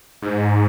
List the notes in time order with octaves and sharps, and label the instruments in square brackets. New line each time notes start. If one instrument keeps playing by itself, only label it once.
[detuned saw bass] G#2